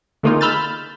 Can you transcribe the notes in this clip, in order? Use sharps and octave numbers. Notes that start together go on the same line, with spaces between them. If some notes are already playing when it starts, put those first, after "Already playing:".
D3 A3 A#3 D#4 F4 G#4
B5 E6 F6 G6 A6